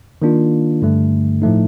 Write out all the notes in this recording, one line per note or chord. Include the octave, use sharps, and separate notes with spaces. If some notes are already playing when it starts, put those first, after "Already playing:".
D#3 A#3 D4 F4
G2 D3 A3
A2 F3 A3 D#4